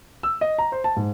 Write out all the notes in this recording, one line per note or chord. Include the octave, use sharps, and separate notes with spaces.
E6
D#5
A#5
C5
A5
G#2